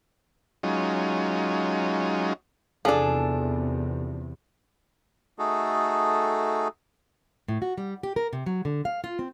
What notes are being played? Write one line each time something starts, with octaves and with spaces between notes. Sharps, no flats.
F#3 G#3 C#4 D#4 F4
E2 C3 F3 D4 G#4 A4
A3 D#4 F#4 G#4 A4
A2
F#4
G3
G4
A#4
C3
F#3
D3
F5
F4
C4